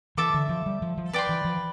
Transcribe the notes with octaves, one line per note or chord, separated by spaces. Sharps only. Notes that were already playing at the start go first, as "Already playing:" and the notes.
E3 A4 E5 A5 D6
D3
F3
G3
F3
F3
B4 D5 G5 C6
E3
F3